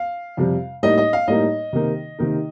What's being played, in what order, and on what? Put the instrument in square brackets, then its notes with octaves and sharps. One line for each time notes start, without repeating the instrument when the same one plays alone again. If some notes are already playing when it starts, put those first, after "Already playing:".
Already playing: [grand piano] F5
F2 C3 G3
A2 G3 A#3 D#4 D#5
D#5
F5
A2 G3 A#3 D#4 D#5
C3 D#3 A#3 D#4
C3 D#3 A#3 D#4